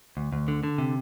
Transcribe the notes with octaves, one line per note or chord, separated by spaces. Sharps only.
D2
D2
D3
D3
C3